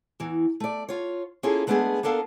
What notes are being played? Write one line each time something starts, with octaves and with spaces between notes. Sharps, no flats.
E2 E3
A3 D5
F4 C#5
A#3 C#4 E4 F4 G#4 A4
G#3 A3 B3 D4 G4 G#4
A#3 B3 D4 A4 A#4 F5